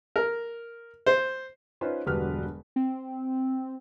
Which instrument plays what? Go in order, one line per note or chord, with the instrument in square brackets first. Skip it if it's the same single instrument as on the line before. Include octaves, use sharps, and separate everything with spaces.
[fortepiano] A#4
C5
[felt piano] C#4 D#4 F4 B4 C5
E1 G2 D3 F#3 B4 F6
[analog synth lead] C4